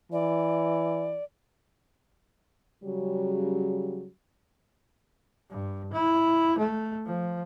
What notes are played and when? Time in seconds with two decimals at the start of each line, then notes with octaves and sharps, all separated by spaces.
0.12 E3 D5
2.83 C#3 F#3 G3
5.49 G2
5.93 E4
6.58 A3
7.05 F3